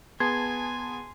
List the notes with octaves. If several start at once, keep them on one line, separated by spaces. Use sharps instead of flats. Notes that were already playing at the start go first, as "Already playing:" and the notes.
B3 G#4 G#5 A5 C6 G#6